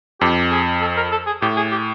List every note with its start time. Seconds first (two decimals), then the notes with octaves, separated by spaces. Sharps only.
0.21 F2 G4
0.50 G#4
0.81 A4
0.97 A#4
1.12 A4
1.27 G#4
1.42 A2 G4
1.57 G#4
1.71 G4